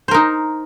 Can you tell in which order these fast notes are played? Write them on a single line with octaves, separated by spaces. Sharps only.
C5 A#4 D#4